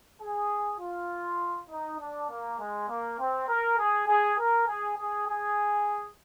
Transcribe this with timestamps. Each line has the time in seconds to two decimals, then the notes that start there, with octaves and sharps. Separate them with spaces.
0.20 G#4
0.79 F4
1.69 D#4
1.99 D4
2.29 A#3
2.59 G#3
2.89 A#3
3.18 C4
3.47 A#4
3.78 G#4
4.07 G#4
4.38 A#4
4.67 G#4
4.97 G#4
5.27 G#4